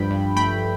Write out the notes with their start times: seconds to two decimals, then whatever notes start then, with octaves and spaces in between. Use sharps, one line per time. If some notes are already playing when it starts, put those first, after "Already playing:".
Already playing: G2 F3 G5 B5
0.11 G2
0.36 A3 G5 B5